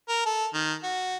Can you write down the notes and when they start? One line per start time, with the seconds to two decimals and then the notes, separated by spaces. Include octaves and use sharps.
0.09 A#4
0.26 A4
0.54 D#3
0.83 F#4